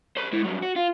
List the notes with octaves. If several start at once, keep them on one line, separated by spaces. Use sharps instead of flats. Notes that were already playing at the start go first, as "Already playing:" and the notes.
C5 B5
G#3 E4
G2 F#3
F#4
F4